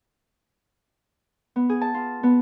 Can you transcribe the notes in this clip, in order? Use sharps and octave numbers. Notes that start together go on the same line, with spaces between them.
B3
G#4
A5
F4
B3